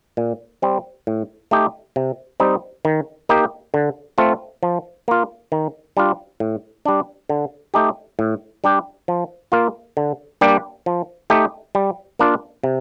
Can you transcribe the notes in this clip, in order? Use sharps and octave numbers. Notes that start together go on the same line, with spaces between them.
A#2
G3 C4
A2
A3 D#4 G4
C3
G3 C4 D#4
D#3
A#3 D#4 G4
D3
A3 C4 F4
F3
A#3 F4
D#3
G3 D4 F4
A2
G3 D4
D3
A3 D#4 G4
A2
G3 D4 G4
F3
A#3 F4
D3
G3 A#3 D4 G4
F3
A3 D#4 G4
G3
A#3 D4 F4
C3